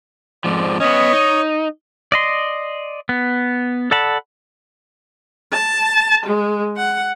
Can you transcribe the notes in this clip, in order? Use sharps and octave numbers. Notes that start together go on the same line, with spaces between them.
F2 G#2 F3 D5
B3 C#4 C#5 D#5
D#4
D5 D#5 C6
B3
A4 D5 F#5 A5 B5
A5
G#3
F#5